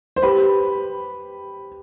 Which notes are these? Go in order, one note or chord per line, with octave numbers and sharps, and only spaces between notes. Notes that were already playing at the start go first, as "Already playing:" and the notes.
C5
G4 B4